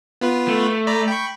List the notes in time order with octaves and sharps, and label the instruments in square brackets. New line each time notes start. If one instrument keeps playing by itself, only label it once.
[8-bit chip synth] B3 F4 B4
[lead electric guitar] A3
[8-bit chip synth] D5 A#5 B5
G5 B5 C#6